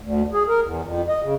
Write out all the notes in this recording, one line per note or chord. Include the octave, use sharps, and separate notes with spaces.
D2
G#4
A#4
E2
F2
D#5
C#3